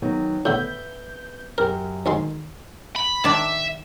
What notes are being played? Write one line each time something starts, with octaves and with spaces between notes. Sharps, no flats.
D#3 F#3 B3
A2 D3 B3 E5 G6
F#2 G4 A#4
D2 D#3 G#3 C6
B5
D#3 D4 D5 E5